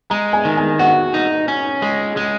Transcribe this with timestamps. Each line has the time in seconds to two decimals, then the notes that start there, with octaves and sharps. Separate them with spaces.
0.10 G#3 A#5
0.33 G#5
0.45 D#3
0.57 G#5
0.79 F#4 F#5
1.14 D#4
1.48 C#4
1.82 G#3
2.17 G#3